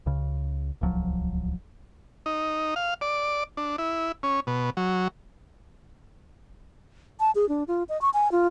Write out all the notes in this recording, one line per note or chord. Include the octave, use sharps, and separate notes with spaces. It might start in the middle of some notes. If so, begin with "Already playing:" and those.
C#2 C#3
D1 C2 F3 F#3
D#4
F5
D5
D4
E4
C#4
B2
F#3
A5
G#4
D4
F4
D#5
C#6
G#5
F4